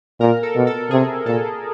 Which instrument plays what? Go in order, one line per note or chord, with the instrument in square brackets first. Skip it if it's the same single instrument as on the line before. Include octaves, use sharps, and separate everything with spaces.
[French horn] A#2 [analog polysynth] A#4
[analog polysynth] A4
[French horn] B2
[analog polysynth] A4
[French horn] C3 [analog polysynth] G#4
[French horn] A#2 [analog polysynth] A4